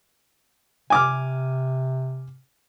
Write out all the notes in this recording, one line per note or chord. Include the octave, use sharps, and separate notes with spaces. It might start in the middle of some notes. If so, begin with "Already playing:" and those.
C3 G#5 D6 F6